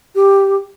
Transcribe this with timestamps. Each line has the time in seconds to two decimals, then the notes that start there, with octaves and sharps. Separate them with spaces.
0.15 G4